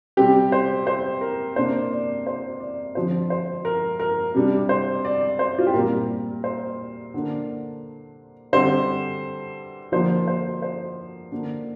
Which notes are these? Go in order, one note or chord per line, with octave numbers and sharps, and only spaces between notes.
C3 G3 C4 G4
C5
C5
A#4
C3 A#3 D4 C5
D5
C5
D5
D3 F3 C4 C5
C5
A#4
A#4
C3 G3 D4
C5
D5
C5
F4
G4
A#2 G3 C4 A#4
C5
D3 A#3 D4
D3 G3 C4 C5
D3 F3 A#3 C5
C5
C5
D3 A#3 D4